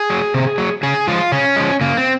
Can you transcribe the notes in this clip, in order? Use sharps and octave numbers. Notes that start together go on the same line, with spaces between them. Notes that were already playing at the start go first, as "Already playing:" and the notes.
Already playing: G#4
F#3
C3
F#3
C#3 G#4
F3 G#3 F4
C#3 C#4
F3 G#3
C#3 A#3
C4